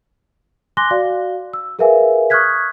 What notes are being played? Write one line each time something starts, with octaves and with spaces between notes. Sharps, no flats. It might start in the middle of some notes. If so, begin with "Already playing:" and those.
G#5 C6 D6 F#6 A#6 G7
F#4 D5 F5
E6
G#4 A#4 B4 E5 F5 G#5
C#6 D#6 F6 F#6 G#6 B6